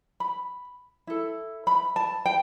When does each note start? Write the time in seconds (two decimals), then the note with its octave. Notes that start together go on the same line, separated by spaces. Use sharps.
0.20 B5
1.07 E4 A4
1.67 B5
1.96 A5
2.26 G5